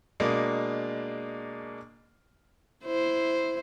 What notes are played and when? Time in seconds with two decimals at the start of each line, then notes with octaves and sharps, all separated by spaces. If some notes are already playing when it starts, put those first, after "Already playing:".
0.20 B2 G#3 A#3 D4
2.85 E4 C5